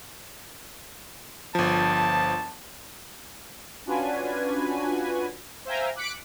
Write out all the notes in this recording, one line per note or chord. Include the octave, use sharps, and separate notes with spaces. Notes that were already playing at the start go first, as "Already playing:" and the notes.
G1 F3 A5
C#4 D4 F4 F#4 B4 G#5
C5 E5 F5 G5 G#5 A#5
D6 F#6 B6 C#7 D7